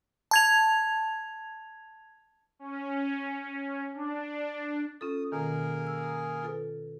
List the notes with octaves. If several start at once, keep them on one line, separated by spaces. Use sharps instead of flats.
A5 G#6 F7
C#4
D4
C#4 F4 A4 D#6
B2 D#3 A#3 G#4 A#4
E6
F4 A4 B4